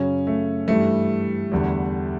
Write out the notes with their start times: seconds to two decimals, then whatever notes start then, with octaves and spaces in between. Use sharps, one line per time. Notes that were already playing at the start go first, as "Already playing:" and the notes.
Already playing: F#2 C#3 F#3 C#4
0.27 A3
0.68 G2 E3 G3 A3
1.52 E2 D3 G3